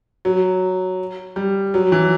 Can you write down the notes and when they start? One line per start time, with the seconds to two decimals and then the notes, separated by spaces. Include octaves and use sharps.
0.25 F#3
1.36 G3
1.74 F#3
1.92 E3